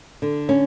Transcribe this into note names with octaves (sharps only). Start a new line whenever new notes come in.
D3
C#4